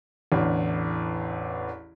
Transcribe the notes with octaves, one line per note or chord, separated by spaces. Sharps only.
A1 E2 D3